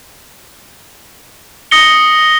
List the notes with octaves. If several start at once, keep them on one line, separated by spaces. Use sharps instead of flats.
D#6 A#6 C#7 G7